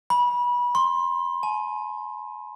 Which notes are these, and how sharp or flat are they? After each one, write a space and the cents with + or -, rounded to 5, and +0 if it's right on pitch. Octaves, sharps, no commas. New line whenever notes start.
B5 -25
C6 +20
G#5 +40